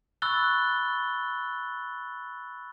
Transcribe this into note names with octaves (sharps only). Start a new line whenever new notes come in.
B5 C#6 E6 F#6 A6 G7